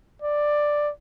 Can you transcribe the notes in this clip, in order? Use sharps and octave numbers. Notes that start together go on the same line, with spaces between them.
D5